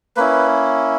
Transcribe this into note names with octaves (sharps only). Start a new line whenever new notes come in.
A#3 C#4 E4 B4